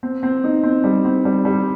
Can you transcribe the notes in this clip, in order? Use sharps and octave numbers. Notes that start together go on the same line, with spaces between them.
C4
C4
D#4
C4
G3
C4
G3
G3